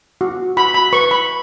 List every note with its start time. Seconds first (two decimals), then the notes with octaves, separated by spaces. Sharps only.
0.21 F#4
0.57 F#4 B5
0.74 B5
0.93 B4 C#6
1.11 B5